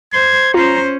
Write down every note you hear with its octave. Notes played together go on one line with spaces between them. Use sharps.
C5 G#6
C#4 F4 C5 A#5